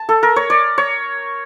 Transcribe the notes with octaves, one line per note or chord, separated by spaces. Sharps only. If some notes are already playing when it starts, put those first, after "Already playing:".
Already playing: A5
A4
A#4
C#5
D5
C#5